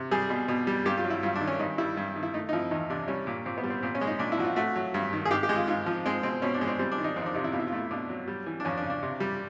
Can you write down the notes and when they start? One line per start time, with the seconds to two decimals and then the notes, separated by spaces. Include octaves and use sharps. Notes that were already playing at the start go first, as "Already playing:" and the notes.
Already playing: C3
0.11 G3 G#4
0.30 B2
0.48 B2
0.67 G3
0.85 G2 G4
0.98 F4
1.04 F#3
1.10 E4
1.23 G2 F4
1.36 D4
1.41 D#3
1.47 C#4
1.59 G2 D#4
1.78 G3 E4
1.97 G2
2.16 D#3
2.23 E4
2.34 A3 D#4
2.49 D#4
2.53 F3 E4
2.71 E2 D#4
2.90 C3 D4
3.08 G3 C#4
3.27 A#2
3.46 A#2 C4
3.58 B3
3.64 G3
3.70 C4
3.83 A#2 C4
3.95 C#4
4.01 G#3
4.07 D#4
4.19 A#2 D4
4.32 E4
4.38 F3 F#4
4.45 F4
4.56 A3 F#4
4.76 F#3
4.94 G2
5.13 D#3
5.25 G#4
5.31 G#2 G4
5.43 G4
5.49 G#3
5.56 F4
5.68 G#2 F4
5.86 F3
6.06 G#3 C4
6.23 B2 C4
6.42 B2 C#4
6.54 D4
6.61 G#3
6.68 C4
6.79 G3 C4
6.92 D4
6.98 D#3
7.04 D#4
7.16 F2 C4
7.22 D#4
7.26 D4
7.34 C3 D#4
7.44 E4
7.52 B2 F4
7.59 E4
7.67 F4
7.72 A3 E4
7.91 B2 D4
8.09 F#3
8.28 G3
8.46 E3
8.60 D4
8.65 F2 C#4
8.77 D4
8.83 C#3
8.90 D4
9.03 C3
9.20 G3